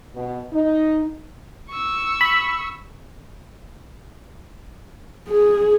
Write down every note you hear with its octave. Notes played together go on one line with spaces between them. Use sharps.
B2
D#4
C#6 E6
B5
G#4